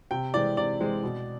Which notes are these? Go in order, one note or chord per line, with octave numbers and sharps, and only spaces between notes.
C3 G5
E3 G#3 C4 D5
C3 D5
E3 G#3 C4
B2